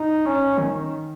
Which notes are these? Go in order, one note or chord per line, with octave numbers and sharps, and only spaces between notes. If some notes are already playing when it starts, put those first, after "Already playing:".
Already playing: D#4
C#4
D#3